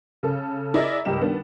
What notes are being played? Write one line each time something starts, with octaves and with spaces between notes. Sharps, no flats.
C#3 A4
E4 G#4 A#4 D5 D#5
C#2 G2 G4 A#4 E7
D#3 G3 B3 D4